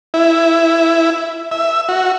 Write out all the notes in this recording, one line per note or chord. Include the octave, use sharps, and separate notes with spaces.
E4
E5
F#4